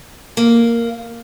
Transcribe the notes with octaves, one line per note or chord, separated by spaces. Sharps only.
A#3